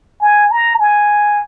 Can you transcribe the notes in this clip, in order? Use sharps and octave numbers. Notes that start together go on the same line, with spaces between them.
G#5
A#5
G#5